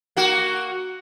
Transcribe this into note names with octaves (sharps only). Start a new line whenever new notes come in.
A#3 F#4